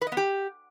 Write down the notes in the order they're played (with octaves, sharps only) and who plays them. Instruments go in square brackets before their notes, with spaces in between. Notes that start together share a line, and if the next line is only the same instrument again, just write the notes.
[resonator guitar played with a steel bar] B4
D#5
B3
G4